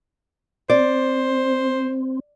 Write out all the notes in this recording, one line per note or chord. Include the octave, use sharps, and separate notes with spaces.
C4 C5 D5